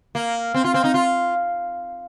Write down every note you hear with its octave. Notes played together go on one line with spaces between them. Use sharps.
A#3
C4
F4
C4
D#4
F4